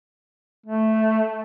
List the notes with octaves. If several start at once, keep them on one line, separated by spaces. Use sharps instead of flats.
A3